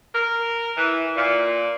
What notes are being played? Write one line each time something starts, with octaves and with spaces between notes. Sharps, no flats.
A#4
E3
A#2